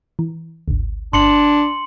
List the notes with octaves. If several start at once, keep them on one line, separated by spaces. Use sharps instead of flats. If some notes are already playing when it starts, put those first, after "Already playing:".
E3
G#1 D2
G1 D4 C6 C#7 F#7